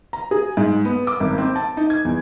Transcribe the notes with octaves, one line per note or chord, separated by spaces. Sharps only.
A#5
G#4
G#2
B3
D6
G#1
C4
A5
D#4
G#6
E2